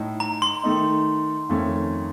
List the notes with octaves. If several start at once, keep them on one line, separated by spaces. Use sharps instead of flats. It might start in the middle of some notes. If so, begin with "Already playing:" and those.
Already playing: A2 A3 D#4
A#5
C6
D#3 A3 D#4
F2 D#3 A3 C#4